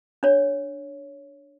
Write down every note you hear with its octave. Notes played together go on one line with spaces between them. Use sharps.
D4 C#5